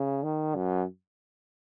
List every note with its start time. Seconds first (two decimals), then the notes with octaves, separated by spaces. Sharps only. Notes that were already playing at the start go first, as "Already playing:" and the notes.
Already playing: C#3
0.23 D#3
0.55 F#2